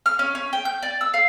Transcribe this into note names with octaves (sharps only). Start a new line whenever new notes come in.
F6
C#4
C#4
G5
G6
D5
E6
F5